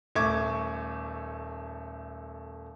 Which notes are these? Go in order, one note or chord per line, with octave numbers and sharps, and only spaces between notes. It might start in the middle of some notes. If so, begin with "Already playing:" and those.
D#1 A3 C#6 D6 G#6